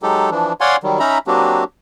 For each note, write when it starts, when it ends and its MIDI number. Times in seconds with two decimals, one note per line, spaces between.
0.03 0.30 54
0.03 0.30 56
0.03 0.30 63
0.03 0.30 67
0.03 0.30 69
0.31 0.53 52
0.31 0.53 53
0.31 0.53 62
0.61 0.76 73
0.61 0.76 74
0.61 0.76 77
0.61 0.76 78
0.61 0.76 80
0.61 0.76 84
0.83 0.99 51
0.83 0.99 54
0.83 0.99 55
0.99 1.18 61
0.99 1.18 63
0.99 1.18 76
0.99 1.18 82
0.99 1.18 83
1.27 1.64 54
1.27 1.64 58
1.27 1.64 60
1.27 1.64 62
1.27 1.64 66
1.27 1.64 67